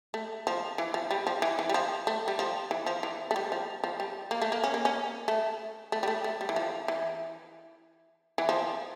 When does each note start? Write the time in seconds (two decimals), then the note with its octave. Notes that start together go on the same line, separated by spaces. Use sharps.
0.14 A3
0.47 F3
0.78 E3
0.94 F3
1.11 G3
1.27 F3
1.42 E3
1.59 E3
1.69 G3
1.74 F3
2.07 A3
2.28 G3
2.39 F3
2.71 E3
2.86 F3
3.03 E3
3.31 A3
3.36 G3
3.52 F3
3.84 F3
4.00 G3
4.31 A#3
4.42 A3
4.52 A#3
4.64 C#4
4.74 A#3
4.85 C#4
5.28 A3
5.92 A3
6.03 G3
6.08 A3
6.24 A3
6.41 G3
6.49 E3
6.56 F3
6.88 E3
8.38 E3
8.49 F3